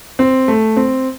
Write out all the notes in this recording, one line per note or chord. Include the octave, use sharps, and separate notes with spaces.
C4
A3
C4